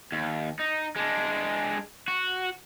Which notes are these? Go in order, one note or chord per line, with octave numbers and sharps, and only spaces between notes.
D#2
D#4
G#3 D4
F#4